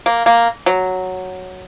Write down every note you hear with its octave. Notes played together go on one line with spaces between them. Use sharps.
A#3
A#3
F#3